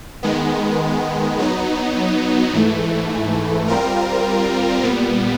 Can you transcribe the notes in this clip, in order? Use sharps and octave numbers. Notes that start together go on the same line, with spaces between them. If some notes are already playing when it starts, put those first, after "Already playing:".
D#3 G#3 B3
F#3 B3 D#4
G#2 E3 A3
G3 C4 F4 A#4
A#2 G3 B3